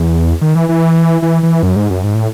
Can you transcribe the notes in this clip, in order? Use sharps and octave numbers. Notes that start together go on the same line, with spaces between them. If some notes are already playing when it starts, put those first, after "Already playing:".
Already playing: E2
D#3
E3
E3
E3
E3
F#2
G#2
F#2
G#2
A2